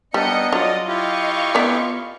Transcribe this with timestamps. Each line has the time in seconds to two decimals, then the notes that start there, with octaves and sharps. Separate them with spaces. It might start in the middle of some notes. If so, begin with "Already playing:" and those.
0.14 G3 B3 D4 D#4 D#5 C#7
0.53 F#3 F4 D5 D#5
0.88 E4 F4 G4 D#5 F5 C#6
1.55 B3 D5